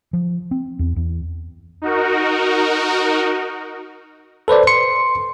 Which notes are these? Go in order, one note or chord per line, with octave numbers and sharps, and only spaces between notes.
F3
C4
E2
E2
D#4 F#4 A#4
A4 B4 C5 D5
C6 C#7